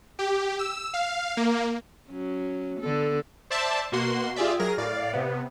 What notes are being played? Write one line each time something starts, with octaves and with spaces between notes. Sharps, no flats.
G4
E6
F5
A#3
F#3 C#4
D3 B3 A4
C5 D5 E5 A5
B2 A#3 F#4 C6
F4 G4 G#4 D5 E5
F#3 G#4 A#4 A#6
A2 D5 F5
C3 B3